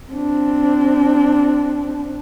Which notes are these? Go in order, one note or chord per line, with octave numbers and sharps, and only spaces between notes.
C4 D4